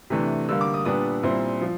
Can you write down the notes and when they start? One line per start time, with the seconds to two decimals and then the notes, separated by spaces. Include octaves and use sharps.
0.10 C3 E3 A3 D4
0.48 D3 G3 A#3 E6
0.61 D6
0.74 D#6
0.85 A#2 G3 B3 D4 D#6
1.23 A#2 G3 C4 E4
1.62 F3